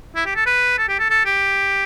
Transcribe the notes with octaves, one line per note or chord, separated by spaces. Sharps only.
E4
G4
A4
B4
A4
G4
A4
A4
G4